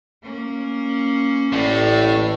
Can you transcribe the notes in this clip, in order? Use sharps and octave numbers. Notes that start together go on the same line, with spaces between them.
A#3 C#4
A1 A2 D5